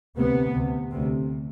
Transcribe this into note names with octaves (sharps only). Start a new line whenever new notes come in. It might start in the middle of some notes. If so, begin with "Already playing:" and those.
D2 C3 B3
D2 C3
D2 C3